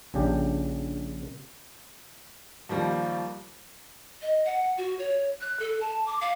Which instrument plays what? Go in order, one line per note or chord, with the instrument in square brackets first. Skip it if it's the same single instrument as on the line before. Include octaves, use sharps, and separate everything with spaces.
[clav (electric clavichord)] A#1 C#3 D4 G4
[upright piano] D#2 F3 G3 A#3
[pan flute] D#5
F#5
F#4
C#5
F#6
A4
A5
D6
F5